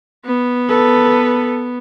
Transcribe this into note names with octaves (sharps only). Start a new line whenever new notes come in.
B3
A4 B4